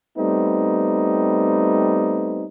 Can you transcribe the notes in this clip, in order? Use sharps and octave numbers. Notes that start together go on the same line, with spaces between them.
G3 A3 B3 C4 D#4